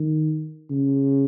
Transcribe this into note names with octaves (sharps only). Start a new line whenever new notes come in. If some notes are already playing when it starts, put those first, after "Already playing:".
Already playing: D#3
C#3